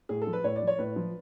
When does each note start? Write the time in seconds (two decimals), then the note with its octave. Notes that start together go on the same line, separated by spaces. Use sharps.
0.09 A2 G#4
0.22 A4
0.27 F3
0.33 B4
0.44 A2 C#5
0.56 D5
0.62 F3
0.67 C#5
0.78 A2 B4
0.96 F3